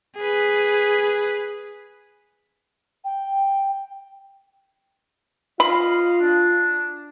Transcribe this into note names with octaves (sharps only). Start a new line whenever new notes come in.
G#4 B4
G5
F4 D#5 F5 B5
D4